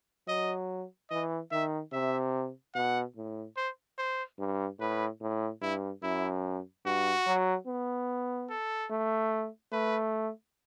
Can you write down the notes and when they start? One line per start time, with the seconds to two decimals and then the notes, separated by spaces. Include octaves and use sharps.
0.28 F#3 D#5
1.10 E3 D#5
1.51 D#3 E5
1.92 C3 E5
2.75 B2 F#5
3.16 A2
3.57 C5
3.98 C5
4.39 G2
4.79 A2 B4
5.22 A2
5.61 G2 E4
6.03 F#2 E4
6.85 G2 F#4
7.27 F#3
7.67 B3
8.50 A4
8.91 A3
9.72 A3 B4